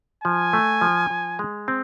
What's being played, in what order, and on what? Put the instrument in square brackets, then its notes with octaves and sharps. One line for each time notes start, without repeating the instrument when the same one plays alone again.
[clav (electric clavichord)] F3 [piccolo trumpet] G#5
[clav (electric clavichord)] A3
F3
F3
G#3
C4